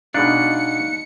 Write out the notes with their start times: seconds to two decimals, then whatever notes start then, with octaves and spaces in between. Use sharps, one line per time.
0.14 B2 G#3 D4 D#4 F5 F#6 C#7